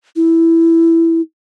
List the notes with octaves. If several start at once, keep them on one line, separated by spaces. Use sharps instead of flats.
E4